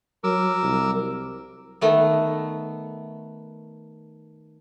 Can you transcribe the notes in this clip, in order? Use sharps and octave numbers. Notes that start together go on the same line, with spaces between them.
F#3 A#4 D6 E6
C2
D#3 A3 B3